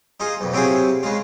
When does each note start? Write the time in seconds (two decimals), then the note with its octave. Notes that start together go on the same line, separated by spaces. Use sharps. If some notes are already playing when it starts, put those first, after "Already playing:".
0.20 D#4 F4 G#4
0.41 B1 F2
0.53 C3 F#3 C4 E4 F4 G#4
1.03 C#3 G#3 F4